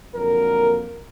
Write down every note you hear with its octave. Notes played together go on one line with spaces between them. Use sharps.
F2 D3 F#3 A#3 A#4